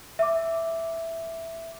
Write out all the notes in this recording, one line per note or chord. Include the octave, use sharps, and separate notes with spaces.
E5 D6